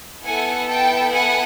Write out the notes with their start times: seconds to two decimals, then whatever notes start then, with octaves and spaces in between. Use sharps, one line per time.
0.24 B3 E4 A4 F#5 G#5
0.68 G5 A5
1.11 F#5 G#5